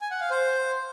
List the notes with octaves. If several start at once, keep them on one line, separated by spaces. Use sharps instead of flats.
G#5
F#5
F5
C5